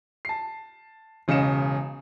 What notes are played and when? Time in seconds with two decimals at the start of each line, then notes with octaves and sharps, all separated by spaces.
0.25 A5 C7
1.28 E1 C#3 D#5 F5 C#7 E7